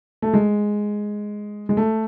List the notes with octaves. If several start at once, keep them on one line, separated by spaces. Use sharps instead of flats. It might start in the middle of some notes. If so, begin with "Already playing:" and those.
A3
G#3
G#3
A3